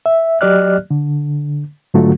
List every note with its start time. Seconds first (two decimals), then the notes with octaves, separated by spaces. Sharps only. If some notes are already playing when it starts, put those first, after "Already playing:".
0.06 E5
0.41 F#3 G4 D5 D#5 F6 F#6
0.91 D3
1.94 G#2 D3 F#3 A3 F4 F#4